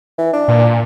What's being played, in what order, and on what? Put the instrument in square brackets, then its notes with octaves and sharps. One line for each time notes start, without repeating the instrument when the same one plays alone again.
[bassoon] E3
D4
[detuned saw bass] A#2